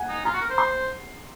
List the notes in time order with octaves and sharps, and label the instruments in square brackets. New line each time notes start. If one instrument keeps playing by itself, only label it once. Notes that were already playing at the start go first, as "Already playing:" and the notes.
Already playing: [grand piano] F#5 G#5
[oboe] D#4
[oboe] F4 [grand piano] A#5
[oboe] F#4
A#4
C5
[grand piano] C6